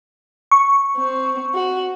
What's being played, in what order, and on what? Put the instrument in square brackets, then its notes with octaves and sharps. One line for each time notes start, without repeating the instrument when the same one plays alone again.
[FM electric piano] C#6
[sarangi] C4
F#4